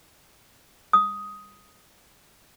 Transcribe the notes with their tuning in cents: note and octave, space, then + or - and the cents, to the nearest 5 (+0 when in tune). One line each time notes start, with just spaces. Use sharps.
D#6 +10